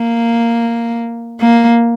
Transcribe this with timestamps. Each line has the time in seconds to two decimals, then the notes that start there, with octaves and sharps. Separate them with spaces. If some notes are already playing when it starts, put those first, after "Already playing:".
Already playing: A#3
1.41 A#3